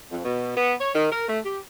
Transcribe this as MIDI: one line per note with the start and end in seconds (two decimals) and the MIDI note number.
0.11 0.20 41
0.25 0.53 47
0.57 0.75 59
0.81 0.90 73
0.95 1.08 51
1.12 1.26 70
1.28 1.39 57
1.45 1.60 67